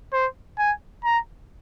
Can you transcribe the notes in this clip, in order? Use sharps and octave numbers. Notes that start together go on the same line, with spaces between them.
C5
G#5
A#5